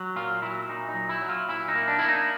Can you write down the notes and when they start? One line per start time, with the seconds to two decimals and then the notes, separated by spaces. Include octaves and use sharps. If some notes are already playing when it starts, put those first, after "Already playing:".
Already playing: F#3
0.16 A#2 F4
0.42 F#3 E4
0.69 A#2 D#4
0.89 D#4
0.95 F#3
1.09 E4
1.22 F#3
1.29 F4
1.48 A#2 E4
1.68 D#4
1.75 A#3
1.88 D4
1.99 A#3 E4
2.09 D#4